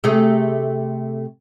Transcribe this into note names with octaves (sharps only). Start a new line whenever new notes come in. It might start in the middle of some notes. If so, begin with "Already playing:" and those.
C3 A3 G#4